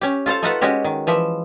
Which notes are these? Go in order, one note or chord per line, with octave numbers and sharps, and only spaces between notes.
C#4 G4
F4 A4 C5 F5
A3 D#4 F4 A4 B4 F#5
G#3 C#4 F#4 G4
D#3
E3 F3 E5